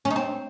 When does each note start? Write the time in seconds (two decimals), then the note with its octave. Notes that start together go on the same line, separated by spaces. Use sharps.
0.05 C#4
0.10 D#4
0.16 C4